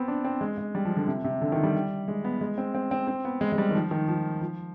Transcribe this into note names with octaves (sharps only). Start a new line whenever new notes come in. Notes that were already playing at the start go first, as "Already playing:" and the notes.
Already playing: B3 C4
D4
C4
G#3
G#3
G3
F3
D3
C3
C3
D3
D#3
G3
G#3
B3
G#3
C4
C4
C4
C4
B3
G#3
G#3
G3
D#3
F3
D#3
F3
F3